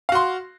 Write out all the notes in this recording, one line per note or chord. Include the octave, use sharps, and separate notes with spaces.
F#4 F5 C6